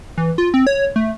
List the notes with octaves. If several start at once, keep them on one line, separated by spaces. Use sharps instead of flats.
E3
F4
C4
C#5
A3